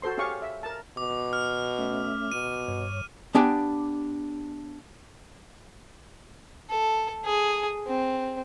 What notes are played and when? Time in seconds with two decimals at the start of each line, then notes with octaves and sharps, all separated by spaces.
0.02 F#4 A4 C5 C6
0.18 C#4 G4 G#4 F5 C#6
0.42 E5
0.63 A#4 A5
0.97 B2 D6
1.33 F6
1.79 A3 C#4 E5
2.32 B2 D#7
2.68 G2 C#5
3.35 B3 D4 G4 G5 G#5
6.70 A4
7.25 G#4
7.87 C4